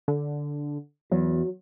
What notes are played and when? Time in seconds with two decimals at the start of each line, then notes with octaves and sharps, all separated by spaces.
0.08 D3
1.12 E2 F#3